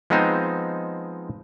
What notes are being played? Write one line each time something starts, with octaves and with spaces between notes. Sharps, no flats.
F3 G#3 B3 C4 D#4 C5